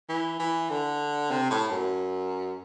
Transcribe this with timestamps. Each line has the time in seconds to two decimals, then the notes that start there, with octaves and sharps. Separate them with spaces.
0.09 E3
0.40 E3
0.70 D3
1.31 C3
1.51 A2
1.70 F#2